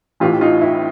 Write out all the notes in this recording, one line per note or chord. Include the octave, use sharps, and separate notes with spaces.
A1 A2 E3 F4 G4
D#4 F4
E4